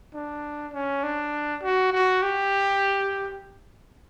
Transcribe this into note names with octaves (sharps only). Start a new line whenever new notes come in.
D4
C#4
D4
F#4
F#4
G4